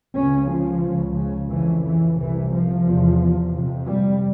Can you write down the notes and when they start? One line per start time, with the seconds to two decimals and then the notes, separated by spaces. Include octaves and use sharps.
0.14 C#2 C#3 C#4
0.49 F3
0.82 C#2 C#3
1.15 C#3
1.49 F2 C#3 E3
1.83 E3
2.16 C2 C3 E3
2.50 F3
2.84 E2 C3
3.51 F2 C3
3.85 G3